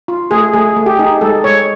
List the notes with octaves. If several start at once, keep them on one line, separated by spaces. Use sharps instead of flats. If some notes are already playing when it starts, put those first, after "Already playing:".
F4
A3 G#4
A3 G#4
A3
G4
D#4 G#4
G#3 A4
G#3 C#5